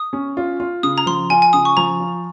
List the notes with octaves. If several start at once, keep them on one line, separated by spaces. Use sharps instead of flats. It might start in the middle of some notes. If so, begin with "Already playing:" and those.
Already playing: D#6
C#4
F4
F4
C#3 D#6
A#5
F3 C6
F4 G#5
G#5
C#3 D#6
C#6
F3 A#5
F4